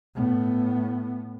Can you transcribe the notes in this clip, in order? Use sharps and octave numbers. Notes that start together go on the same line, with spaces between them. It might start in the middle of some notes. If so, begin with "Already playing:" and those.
A2 B3